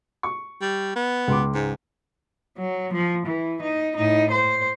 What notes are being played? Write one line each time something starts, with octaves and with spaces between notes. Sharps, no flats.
C#6
G3
B3
C#2 C6 D6
G#2
F#3
F3
E3
D#4
A2 D#4
C5